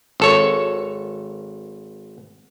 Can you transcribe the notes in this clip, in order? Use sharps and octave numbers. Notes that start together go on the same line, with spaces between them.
G#1 A4 C#5